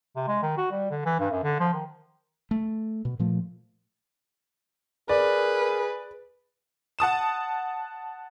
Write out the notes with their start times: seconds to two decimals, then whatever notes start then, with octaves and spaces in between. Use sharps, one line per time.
0.16 C3
0.28 G#3
0.43 D#3
0.57 F#4
0.71 G3
0.90 D3
1.05 E3
1.19 G2
1.31 F#2
1.43 D3
1.60 F3
1.74 D#3
2.51 A3
3.05 B2
3.19 A#2 F3 A3
5.09 G#4 A#4 B4 D5
6.99 F#5 A5 D#6 E7